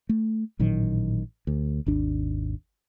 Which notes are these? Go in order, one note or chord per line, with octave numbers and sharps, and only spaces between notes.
A3
A1 A#2 D#3 F#3
D2
G#1 D#2 D4